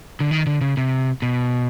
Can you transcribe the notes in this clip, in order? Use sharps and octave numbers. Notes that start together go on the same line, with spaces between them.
D3
D#3
D3
C#3
C3
B2